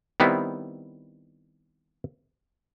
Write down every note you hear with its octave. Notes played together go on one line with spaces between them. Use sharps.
D#3 G3 B3 C4 E4